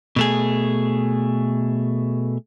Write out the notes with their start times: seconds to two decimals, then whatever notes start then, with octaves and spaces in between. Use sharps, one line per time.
0.16 B2 A3 G#4